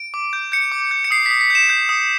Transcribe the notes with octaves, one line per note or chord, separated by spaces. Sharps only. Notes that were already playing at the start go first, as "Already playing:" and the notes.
Already playing: D7
D6
G6
G6 C#7
D6
G6
C#7
D#6 C7
D#6 B6
B6
G6 E7
G6
D#6